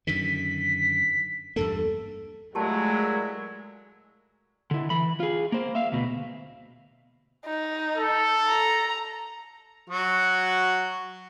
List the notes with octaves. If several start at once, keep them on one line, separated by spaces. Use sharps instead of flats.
F#2 D3 D#3 B6
E2 G2 A#3 A4
A#2 F#3 G#3 A3 E4 G4 A5
D3 E4
E3 B5
F4 G#4
A#3 C5
E5 F5
D2 B2
D#4
A4
A#5
F#3 F#4